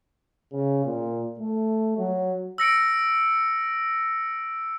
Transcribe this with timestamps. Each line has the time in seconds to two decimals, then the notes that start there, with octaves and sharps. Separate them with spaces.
0.52 C#3
0.85 A#2
1.39 A3
1.98 F#3
2.58 E6 A#6 C#7 D7